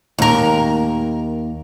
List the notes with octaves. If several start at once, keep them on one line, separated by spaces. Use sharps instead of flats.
D#2 A#4